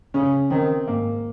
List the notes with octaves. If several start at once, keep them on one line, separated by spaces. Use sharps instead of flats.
C#3 C#4
D#3 C4
G#2 A#3